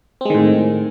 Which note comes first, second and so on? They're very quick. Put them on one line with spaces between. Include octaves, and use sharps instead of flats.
C4 G#3 D#3 A2